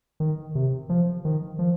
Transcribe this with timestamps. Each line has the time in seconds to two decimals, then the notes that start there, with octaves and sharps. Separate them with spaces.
0.20 D#3
0.55 C3
0.89 F3
1.25 D#3
1.59 F3